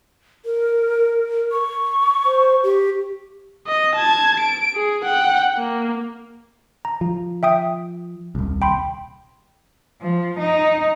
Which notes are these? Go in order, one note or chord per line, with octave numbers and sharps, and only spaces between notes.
A#4
C#6
C5
G4
D#5
A5 G#6
D7
G#4
F#5 G5
A#3
A#5
F3
E5 G5 D#6
D#1 C2
G5 B5 C6
F3
D#4